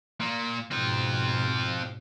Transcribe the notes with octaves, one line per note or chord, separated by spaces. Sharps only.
A#2 A#3
G#2 B2 C4 F4